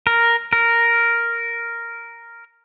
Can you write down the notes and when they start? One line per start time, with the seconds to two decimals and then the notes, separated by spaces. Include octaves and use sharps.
0.07 A#4
0.53 A#4